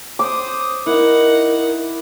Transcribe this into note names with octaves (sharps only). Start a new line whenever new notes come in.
C5 D6 D#6
D#4 E4 A#4 F#5